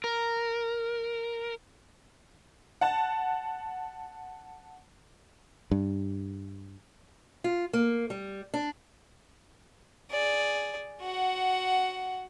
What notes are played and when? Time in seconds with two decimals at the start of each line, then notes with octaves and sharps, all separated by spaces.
0.04 A#4
2.81 F#5 A5
5.71 G2
7.44 F4
7.73 A#3
8.10 G3
8.54 D4
10.11 G#4 D5
11.02 F#4 F#5